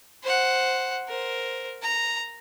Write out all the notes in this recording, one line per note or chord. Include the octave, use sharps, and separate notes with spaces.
C5 F#5
A#4 C5
A#5